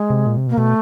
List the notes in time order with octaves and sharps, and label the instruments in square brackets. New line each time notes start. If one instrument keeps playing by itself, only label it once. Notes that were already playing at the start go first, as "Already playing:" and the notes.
Already playing: [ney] G#3
[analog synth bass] C3
A#2
C3
B2
[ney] A#3
[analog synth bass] B2 [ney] A3